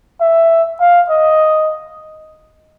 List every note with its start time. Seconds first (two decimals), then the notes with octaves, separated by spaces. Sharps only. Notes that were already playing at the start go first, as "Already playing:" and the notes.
0.21 E5
0.80 F5
1.10 D#5